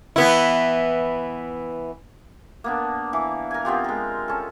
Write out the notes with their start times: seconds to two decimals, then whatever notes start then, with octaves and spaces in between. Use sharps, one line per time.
0.16 E3 B3 E4
2.64 A#3 B3 D4
3.13 E3
3.51 A#4 G#5
3.65 B3 C4 F4 G4
3.84 G#3 A#4
4.28 C#4 A4